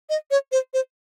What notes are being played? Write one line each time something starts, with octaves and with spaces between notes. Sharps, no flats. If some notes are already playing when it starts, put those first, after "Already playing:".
D#5
C#5
C5
C5